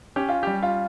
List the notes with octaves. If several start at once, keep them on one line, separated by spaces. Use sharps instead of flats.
C#4 G4
F4
G3 G4
F4